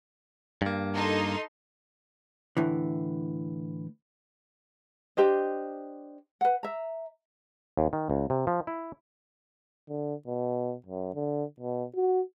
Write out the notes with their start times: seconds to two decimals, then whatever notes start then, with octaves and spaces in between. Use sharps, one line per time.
0.62 G2 A#3
0.94 D#4 A4 C6
2.57 A2 D3 E3
5.17 D4 G4 C5 D#5
6.41 B4 F#5
6.63 E5 A#5
7.77 D#2
7.93 D#3
8.10 C#2
8.30 C3
8.47 F3
8.67 E4
9.88 D3
10.26 B2
10.86 F#2
11.14 D3
11.60 B2
11.95 F#4